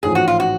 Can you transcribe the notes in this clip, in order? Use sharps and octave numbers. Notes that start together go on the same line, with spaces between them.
A1 G#2 F3 G#4
F#4
F4
F#4